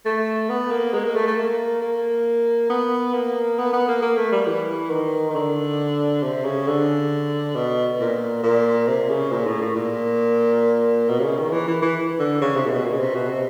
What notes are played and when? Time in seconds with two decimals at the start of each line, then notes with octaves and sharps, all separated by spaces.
0.05 A3
0.50 B3
0.71 A#3
0.94 G#3
1.04 A#3
1.16 A3
1.27 A3
1.38 A#3
1.82 A#3
2.70 B3
3.14 A#3
3.58 B3
3.73 B3
3.88 A#3
4.02 A#3
4.17 A3
4.32 G3
4.46 E3
4.90 D#3
5.30 D#3
5.35 D3
6.23 C3
6.45 C#3
6.67 D3
7.55 B2
7.99 A#2
8.43 A#2
8.88 C3
9.10 C#3
9.32 A#2
9.46 A2
9.61 A2
9.76 A#2
11.08 B2
11.19 C3
11.23 C#3
11.38 D#3
11.52 E3
11.67 E3
11.82 E3
12.19 D3
12.41 C#3
12.56 C3
12.66 A#2
12.70 B2
12.85 A#2
12.93 C#3
12.99 C3
13.15 B2
13.29 C3